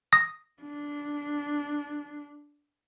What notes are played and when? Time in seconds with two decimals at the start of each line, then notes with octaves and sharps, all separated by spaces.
0.13 D#6 A#6
0.62 D4